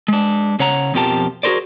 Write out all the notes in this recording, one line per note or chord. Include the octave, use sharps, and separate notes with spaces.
G#3 D4
C#3 C#5 F#5 A#5
F2 B2 F3 G4 A#4 A5
F#4 G#4 A#4 C5 D5